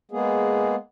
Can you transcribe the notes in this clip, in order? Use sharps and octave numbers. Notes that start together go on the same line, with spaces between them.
G#3 A#3 B3 G#4